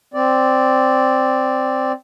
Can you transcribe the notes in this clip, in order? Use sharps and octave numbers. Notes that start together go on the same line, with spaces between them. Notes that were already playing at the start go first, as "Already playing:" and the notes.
C4 D5